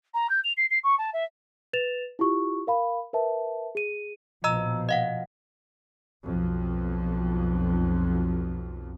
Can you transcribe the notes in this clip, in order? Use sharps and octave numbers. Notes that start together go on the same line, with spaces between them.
A#5
G6
F7
C7
C7
C#6
A5
E5
B4 A6 E7 F7
E4 F4 G4 C#6
A#4 F5 B5
A#4 B4 E5 A5
G#4 D#7
A#1 B2 F3 D#5 A#5 E6
D#5 F5 F#5
B1 F2